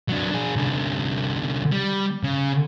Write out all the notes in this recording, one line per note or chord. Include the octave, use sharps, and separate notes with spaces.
F#3 D4
D4 G#4
C2 D3
G3
C#3